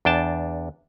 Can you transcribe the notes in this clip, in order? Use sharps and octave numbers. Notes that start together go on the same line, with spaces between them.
E2 D4 G5 A5